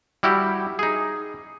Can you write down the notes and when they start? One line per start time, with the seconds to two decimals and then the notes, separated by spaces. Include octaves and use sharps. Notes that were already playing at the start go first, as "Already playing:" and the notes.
0.23 G3 E4 F#4 G4
0.79 D#4 G#4